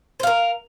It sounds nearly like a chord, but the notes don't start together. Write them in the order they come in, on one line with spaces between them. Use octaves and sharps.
C5 F5 A#4